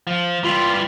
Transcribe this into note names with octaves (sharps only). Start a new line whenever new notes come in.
F3
E3 G3 F4